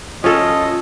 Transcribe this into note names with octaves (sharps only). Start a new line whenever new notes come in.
C#4 F4 A4 D#5